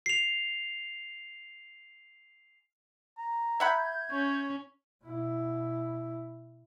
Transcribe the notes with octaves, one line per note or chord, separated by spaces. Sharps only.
C7 F7
A#5
E5 F#5 B5 G6 G#6
C#4 C#5
B2 E4